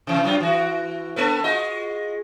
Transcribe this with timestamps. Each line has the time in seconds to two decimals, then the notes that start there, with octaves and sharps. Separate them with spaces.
0.07 C3 E3
0.24 F#2 F#3 F4
0.40 E3 F#4
1.16 A#3 A4 B4
1.44 G#3 F4 D#5